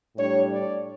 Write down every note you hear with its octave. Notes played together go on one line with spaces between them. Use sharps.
A2 G3 D4 C#5
D5